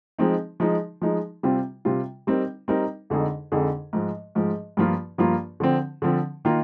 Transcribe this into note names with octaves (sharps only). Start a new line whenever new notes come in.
F3 G#3 C4 D#4
F3 G#3 D#4
F3 G#3 D#4
C3 G3 C4 F4
C3 G3 C4 F4
G3 C4 D#4 A#4
G3 C4 D#4 A#4
F2 D3 G#3 D#4 G#4
F2 D3 G#3 D#4 G#4
G#2 F3 G#3
G#2 F3 G#3
G2 F3 A#3 F4
G2 F3 A#3 F4
D3 F3 C4
D3 F3 C4
D#3 A#3 F4